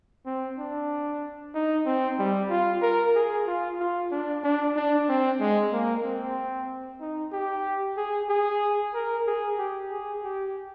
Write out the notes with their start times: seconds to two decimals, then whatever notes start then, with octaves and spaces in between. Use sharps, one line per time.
0.26 C4
0.58 D4
1.55 D#4
1.86 C4
2.19 G3
2.50 F4
2.82 A#4
3.15 G#4
3.47 F4
3.80 F4
4.11 D4
4.44 D4
4.76 D4
5.09 C4
5.40 G#3
5.73 A#3
6.04 C4
7.01 D#4
7.33 G4
7.97 G#4
8.29 G#4
8.94 A#4
9.27 G#4
9.58 G4
9.91 G#4
10.23 G4